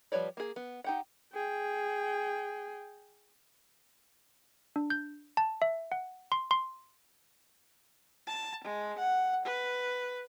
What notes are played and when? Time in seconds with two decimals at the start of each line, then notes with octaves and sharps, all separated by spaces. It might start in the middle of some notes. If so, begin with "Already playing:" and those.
0.12 F3 G3 B4 C#5 D5
0.37 A#3 G#4
0.56 B3
0.84 D#4 G4 F#5
1.33 G#4 G5
4.76 D4
4.90 G6
5.37 A5
5.62 E5
5.92 F#5
6.32 C6
6.51 C6
8.27 A5
8.64 G#3
8.98 F#5
9.46 B4